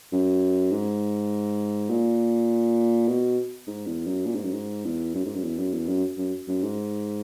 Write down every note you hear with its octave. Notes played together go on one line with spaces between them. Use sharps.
F#2
G#2
A#2
B2
G#2
E2
F#2
A#2
G#2
F#2
G#2
E2
F#2
G#2
F#2
E2
F#2
E2
F#2
F#2
F#2
G#2